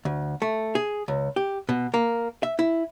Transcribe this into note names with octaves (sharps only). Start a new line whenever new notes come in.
D2
A3
G#4
C#2
G4
B2
A#3
E5
E4